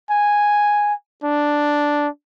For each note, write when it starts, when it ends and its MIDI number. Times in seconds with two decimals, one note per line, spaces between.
0.10 0.94 80
1.24 2.08 62